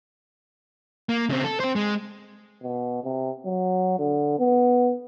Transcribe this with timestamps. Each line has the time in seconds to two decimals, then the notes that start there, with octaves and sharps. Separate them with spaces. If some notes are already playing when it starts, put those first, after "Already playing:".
1.09 A#3
1.30 C#3 C4
1.43 A4
1.60 C4 C5
1.76 G#3
2.63 B2
3.03 C3
3.45 F#3
3.99 D3
4.39 B3